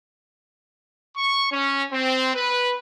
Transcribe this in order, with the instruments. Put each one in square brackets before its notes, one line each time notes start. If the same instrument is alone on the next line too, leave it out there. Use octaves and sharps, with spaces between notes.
[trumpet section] C#6
C#4
C4
B4